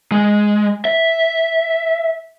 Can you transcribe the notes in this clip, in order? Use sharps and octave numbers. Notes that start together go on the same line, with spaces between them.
G#3
E5